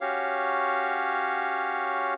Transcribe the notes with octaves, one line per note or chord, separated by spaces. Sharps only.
C#4 F#4 G4 C#5 F5